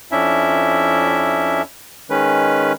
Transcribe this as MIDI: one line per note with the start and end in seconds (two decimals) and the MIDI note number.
0.11 1.62 41
0.11 1.62 61
0.11 1.62 62
0.11 1.62 64
0.11 1.62 76
2.10 2.72 51
2.10 2.72 56
2.10 2.72 61
2.10 2.72 71